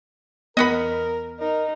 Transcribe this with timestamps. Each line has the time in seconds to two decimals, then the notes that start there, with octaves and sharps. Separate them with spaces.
0.57 E2 B3 A#4 D#5 F#5 B5
1.40 D#4 A#4